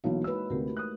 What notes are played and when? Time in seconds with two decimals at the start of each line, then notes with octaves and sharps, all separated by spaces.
0.04 B1 E3 A#3 F#4 C#5 F5
0.24 G#3 D#4 E4 B4 E6
0.50 D2 C3 A3 G4 A#4
0.77 D#6 F#6